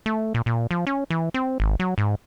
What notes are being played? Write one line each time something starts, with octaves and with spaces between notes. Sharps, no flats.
A3
A#2
A#2
F3
C#4
E3
C4
G#1
F#3
G#2